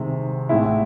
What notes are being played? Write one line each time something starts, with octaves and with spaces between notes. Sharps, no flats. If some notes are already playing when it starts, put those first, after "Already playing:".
Already playing: C2 C3 D#3 G#3
A1 A2 G#3 E4